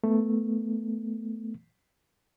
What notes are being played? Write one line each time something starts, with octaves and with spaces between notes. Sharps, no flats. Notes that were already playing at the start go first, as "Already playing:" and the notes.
A3 B3